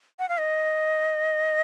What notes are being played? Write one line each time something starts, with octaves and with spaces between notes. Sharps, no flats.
F#5
F5
D#5